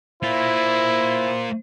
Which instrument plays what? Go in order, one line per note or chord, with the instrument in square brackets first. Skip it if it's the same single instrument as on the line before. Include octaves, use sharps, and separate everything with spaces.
[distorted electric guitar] A#3 F4 [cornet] E4 [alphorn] C5